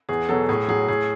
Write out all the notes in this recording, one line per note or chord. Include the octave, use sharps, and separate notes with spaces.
E2 G#4
B2 F#3 A4
A2 G#4
F#3 G#4
A2 G#4